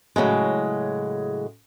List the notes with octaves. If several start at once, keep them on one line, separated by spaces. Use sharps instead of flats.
A2 C#3 F#3 G#3